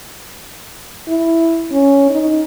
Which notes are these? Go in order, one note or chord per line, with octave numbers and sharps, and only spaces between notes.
E4
C#4
D#4